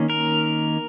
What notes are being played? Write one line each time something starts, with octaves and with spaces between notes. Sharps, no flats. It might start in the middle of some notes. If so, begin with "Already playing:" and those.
Already playing: D#3 A#3 C#4
A#4